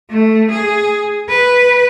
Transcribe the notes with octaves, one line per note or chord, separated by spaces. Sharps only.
A3
G#4
B4